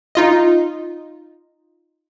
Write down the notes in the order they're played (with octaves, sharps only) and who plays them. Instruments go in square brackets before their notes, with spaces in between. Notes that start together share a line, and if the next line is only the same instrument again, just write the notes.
[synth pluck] D#4 F4 D#5